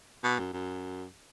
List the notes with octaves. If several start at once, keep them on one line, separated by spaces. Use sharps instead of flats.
B2
F#2
F#2